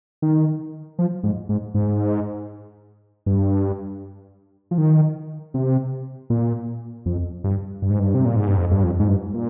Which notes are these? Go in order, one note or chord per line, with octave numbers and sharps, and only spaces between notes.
D#3
F3
G#2
G#2
G#2
G2
F3
D#3
C3
A#2
F2
G2
G2
G#2
G2
C3
A#2
G#2
G2
F2
G2
F2
G#2
G2
A#2